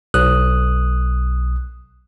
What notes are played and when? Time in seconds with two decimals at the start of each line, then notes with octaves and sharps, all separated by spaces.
0.14 B1 D#6 F#6